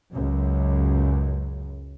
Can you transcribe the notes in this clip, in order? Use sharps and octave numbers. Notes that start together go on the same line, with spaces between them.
C#2 F#2